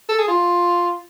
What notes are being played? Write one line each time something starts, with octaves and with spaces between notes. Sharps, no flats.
A4
G#4
F4